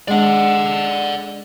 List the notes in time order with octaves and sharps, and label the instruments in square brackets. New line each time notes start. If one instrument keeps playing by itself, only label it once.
[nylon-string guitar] G#3 D4 [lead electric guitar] D5 F#5